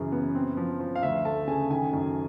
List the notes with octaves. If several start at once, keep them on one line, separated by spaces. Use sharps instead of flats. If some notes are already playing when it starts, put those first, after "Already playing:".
Already playing: F#2 C#3 E3
B3
C4
F3
F3
F5
D2 E5
A3 A5
C#3 G#5
D#3 G#5
F#2